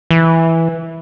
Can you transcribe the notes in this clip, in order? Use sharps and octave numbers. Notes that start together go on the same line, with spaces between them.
E3